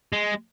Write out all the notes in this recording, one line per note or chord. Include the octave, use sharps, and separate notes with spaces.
G#3